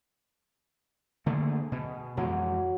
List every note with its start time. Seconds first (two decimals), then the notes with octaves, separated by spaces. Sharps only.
1.26 D3 A3 A#3 G#4
1.72 B2
2.17 F2 E3 F#3 G#3